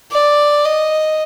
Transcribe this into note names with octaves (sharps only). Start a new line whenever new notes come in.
D5
D#5